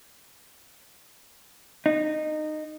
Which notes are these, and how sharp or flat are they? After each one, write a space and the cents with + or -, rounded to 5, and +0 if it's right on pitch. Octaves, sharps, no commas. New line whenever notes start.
D#4 -20